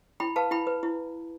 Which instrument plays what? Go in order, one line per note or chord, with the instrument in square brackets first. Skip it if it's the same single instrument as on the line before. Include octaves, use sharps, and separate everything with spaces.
[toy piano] E4 G5 B5
B4 F5 A5
E4 G5 B5
B4
E4